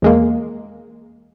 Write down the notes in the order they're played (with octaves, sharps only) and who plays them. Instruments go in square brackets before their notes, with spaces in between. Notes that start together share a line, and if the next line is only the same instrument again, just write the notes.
[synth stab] E2 G#3 A#3